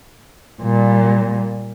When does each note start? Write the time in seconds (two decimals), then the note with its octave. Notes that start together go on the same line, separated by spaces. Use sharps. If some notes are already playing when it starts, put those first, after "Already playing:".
0.62 A#2 G3